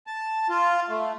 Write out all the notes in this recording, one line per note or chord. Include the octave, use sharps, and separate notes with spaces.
A5
F4
A3